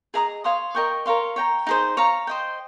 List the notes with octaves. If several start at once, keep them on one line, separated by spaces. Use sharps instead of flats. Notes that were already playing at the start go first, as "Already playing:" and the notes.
G#4 D#5 A#5 D#6
C#5 F5 C6 D#6
A#4 D#5 G5 C#6
A#4 C#5 F5 C6
C#5 G5 A#5
D#4 G#4 C5
C#5 F5 A#5
C5 D#5 G5